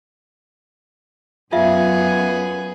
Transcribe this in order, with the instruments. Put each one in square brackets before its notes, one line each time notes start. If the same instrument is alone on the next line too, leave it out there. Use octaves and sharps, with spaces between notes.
[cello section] F#2 [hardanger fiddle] B3 G#4 [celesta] F4 E5 F5